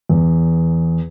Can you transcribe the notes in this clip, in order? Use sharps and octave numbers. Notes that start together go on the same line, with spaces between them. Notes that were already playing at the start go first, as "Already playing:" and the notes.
E2